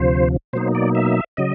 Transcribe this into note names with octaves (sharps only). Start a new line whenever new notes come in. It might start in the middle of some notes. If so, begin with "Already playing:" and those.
Already playing: D2 C3 F3 C5
B2 F#3 A#3 D#4 C5
D5
E5
C#3 F#3 D#5